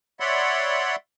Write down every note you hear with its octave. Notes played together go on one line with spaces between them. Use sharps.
C#5 D5 E5 F#5 B5 C6